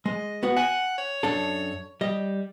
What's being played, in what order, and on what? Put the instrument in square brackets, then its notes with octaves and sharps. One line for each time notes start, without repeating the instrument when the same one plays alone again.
[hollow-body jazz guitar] G#3 [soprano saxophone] D#5
[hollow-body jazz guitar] B3 F#4
[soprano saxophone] F#5 [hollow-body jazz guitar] G#5
[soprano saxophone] C#5
[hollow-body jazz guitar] F#2 D4 A4
G3 D#5